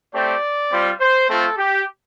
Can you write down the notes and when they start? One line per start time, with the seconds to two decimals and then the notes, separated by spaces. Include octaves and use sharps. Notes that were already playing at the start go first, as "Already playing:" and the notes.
0.14 A3 C4 G4 D5
0.71 G3 C4 F4
1.00 C5
1.28 A3 C4 F4 A4
1.58 G4